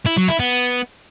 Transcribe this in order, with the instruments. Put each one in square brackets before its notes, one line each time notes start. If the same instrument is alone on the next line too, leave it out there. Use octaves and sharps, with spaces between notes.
[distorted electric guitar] E4
F#3
E4
B3